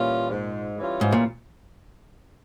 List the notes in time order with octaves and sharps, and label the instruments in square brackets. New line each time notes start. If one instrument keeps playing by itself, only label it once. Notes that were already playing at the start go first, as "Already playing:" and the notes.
Already playing: [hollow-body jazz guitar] A#2 [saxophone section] E3 G3 C#4 F4
[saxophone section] G#2
E3 G3 C#4 F4
[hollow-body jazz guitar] G#2
A#2